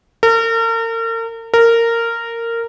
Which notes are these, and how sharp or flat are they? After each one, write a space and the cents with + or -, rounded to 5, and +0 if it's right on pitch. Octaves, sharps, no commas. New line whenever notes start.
A#4 -40
A#4 -15